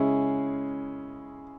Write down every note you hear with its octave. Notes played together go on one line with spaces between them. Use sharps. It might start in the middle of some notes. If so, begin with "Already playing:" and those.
Already playing: C#3 G#3 C#4 E4 G#4